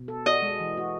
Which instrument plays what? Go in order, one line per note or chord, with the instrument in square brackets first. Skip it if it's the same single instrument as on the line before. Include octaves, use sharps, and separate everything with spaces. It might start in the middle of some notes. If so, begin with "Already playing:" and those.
Already playing: [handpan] B2
A4
[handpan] F#4 [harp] D#5
[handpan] G#3
E3
F#4